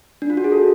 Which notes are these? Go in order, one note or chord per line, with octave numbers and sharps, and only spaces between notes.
D4
F4
F#4
G#4
A4